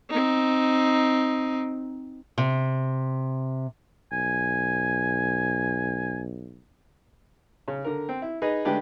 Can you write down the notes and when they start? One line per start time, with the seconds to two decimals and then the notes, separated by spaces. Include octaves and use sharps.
0.10 C4 D#4
2.38 C3
4.12 B1 G#5
7.68 C#3
7.84 D3 A#4
8.09 C4
8.22 E4
8.42 D#4 G#4 B4 D#5
8.65 D3 G#3 A3 D4 G4 B4